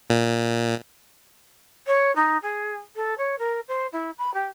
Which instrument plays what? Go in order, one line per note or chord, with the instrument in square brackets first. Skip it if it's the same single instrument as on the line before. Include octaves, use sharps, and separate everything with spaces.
[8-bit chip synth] A#2
[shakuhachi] C#5
D#4
G#4
A4
C#5
A#4
C5
E4
B5
G4